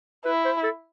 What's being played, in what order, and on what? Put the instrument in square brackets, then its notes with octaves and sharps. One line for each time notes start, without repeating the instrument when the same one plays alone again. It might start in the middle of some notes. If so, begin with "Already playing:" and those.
[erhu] E4 [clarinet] B4
[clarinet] C5
A4